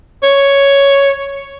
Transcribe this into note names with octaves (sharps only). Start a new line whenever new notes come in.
C#5